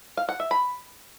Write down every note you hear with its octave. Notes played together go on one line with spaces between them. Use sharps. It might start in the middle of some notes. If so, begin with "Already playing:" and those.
F5
F#5
E5
B5